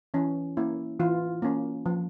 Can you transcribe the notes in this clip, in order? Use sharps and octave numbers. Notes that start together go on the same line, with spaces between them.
E3 C#4
A#3 C#4 E4
E3 F4
A#3 C#4
F3